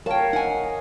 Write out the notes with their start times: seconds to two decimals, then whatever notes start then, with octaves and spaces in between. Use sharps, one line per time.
0.06 A#4 C#5 F5 G5 A5
0.33 D#4 F#5 G#5